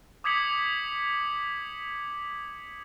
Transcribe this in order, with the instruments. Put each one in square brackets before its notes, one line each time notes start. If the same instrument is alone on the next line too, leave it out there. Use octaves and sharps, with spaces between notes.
[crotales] D6 D#6 G#6 B6 C#7 F#7